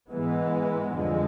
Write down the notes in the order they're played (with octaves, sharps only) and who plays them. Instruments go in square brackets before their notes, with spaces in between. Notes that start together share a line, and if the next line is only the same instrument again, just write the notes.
[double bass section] G#2 E3 G#3 B3
F2 D3 F3 G#3